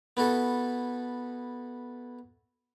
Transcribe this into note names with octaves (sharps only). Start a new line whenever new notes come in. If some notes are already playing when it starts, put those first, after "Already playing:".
B3 E4 F#4 A4